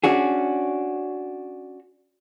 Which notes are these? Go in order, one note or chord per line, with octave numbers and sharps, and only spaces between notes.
C#4 D4 F#4 G#4